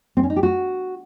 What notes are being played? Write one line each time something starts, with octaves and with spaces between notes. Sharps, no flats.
C4
C#4
D#4
G4
F#4